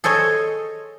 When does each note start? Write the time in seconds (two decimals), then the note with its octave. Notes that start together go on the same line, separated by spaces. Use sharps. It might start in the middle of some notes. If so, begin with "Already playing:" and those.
0.04 G#4 A4 C5 C#5 D#5